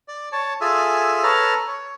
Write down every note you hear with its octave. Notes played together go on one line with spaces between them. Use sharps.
D5
C#5 A5
F4 G#4 A4 E5 G#5
A4 B4 C#5 A5 A#5 F6
C#5